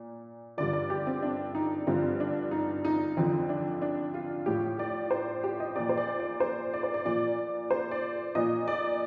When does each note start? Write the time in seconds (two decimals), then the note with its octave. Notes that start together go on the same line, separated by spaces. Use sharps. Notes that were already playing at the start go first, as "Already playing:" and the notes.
Already playing: A#2
0.57 G2 D3 F3 D5
0.73 D5
0.90 G4
1.07 C4
1.23 D4
1.55 D#4
1.87 G2 D3 F3 C4
2.20 D4
2.51 D#4
2.85 D#4
3.17 F2 D3 F3 C4
3.49 D4
3.82 D4
4.14 F4
4.46 A2 F3 G4
4.79 D5
5.11 C5
5.44 G4
5.60 D#5
5.76 A#2 F3 D5
5.89 C5
5.97 D5
6.20 D5
6.40 C5
6.73 D5
6.83 C5
6.94 D5
7.05 A#2 F3 D5
7.71 C5
7.91 D5
8.35 A#2 F3 D#5
8.68 D5